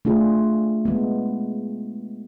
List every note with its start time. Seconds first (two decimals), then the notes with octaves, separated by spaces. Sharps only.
0.05 A3 D4 F4 G#4
0.85 G#3 B3